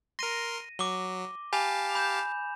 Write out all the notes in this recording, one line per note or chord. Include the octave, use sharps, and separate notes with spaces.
A#4 C6 A#6 D#7
F#3 D6 G7
G4 F5 G#5 A5 B5 F7
B5 G6 E7